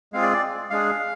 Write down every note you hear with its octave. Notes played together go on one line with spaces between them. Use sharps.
G#3 C4 F4 G#4 F5
D5
D5
G#3 D4 G#4 F5